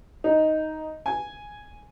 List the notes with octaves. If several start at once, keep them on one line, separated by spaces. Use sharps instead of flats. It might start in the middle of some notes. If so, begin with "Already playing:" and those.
D#4
G#5